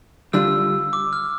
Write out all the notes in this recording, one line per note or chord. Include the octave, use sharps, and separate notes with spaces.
D3 G3 D4 F4 E6
D6
F6